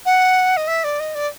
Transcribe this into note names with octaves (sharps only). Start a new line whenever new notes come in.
F#5
D#5
E5
D5
D#5
D5